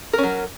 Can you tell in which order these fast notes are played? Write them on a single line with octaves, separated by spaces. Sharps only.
A#4 C#4 F#3